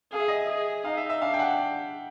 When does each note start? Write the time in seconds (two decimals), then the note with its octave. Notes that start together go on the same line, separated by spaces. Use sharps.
0.12 G#4 F5
0.20 E5
0.28 D#5
0.35 E5
0.49 G#4
0.85 D#4 F5
0.97 E5
1.09 E5
1.21 D4 F5
1.34 G5
1.39 F#5